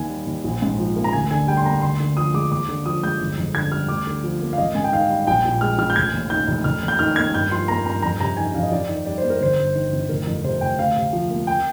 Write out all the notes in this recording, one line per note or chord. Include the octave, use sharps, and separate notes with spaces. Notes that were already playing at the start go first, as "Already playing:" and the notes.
Already playing: D#2 D#3 G#5
G3
D#2
A#1
G#2
F3
A#3
A#5
D2 G#5
D3 G#5
G3 G5
C6
A#3 A#5
D2 C6
D3
F3 D#6
G#3 D6
D#2 D6
D3
F3 D#6
G#3 G6
G1
F2
D3 G#6
G3 F6
D2 D6
D3
F3
A#3
F5
G#1 D#5
G#2 G#5
G5
D#3 F5
G3
A#1 G5
A#2
G#3 F6
A#1 F6
G6
F1 G#6
D#2
D#3 G6
F1
F1 F6
D#2
G6
D#3 F6
A#3 G#6
G2 G6
F3 C6
A#3 A#5
G2 A#5
F2 A#5
C3 A#5
D#3 G#5
F2 F5
D#5
F2 D5
D#3
G3 D5
C5
A#3
A#4
G1 C5
G2
D#3
G1
F1 A#4
F2
C3 C5
F1 G5
D2 F5
C3
F3
A#3
G5